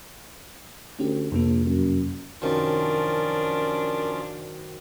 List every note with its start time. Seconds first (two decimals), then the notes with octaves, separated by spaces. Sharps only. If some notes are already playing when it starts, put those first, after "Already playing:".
0.99 D2 C#4 G4
1.32 A#1 F2 C3 A#3
1.66 F#2
2.42 F#2 C3 D#3 F3 C#4 D4 F4 A#4